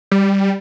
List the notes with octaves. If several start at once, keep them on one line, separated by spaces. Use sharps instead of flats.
G3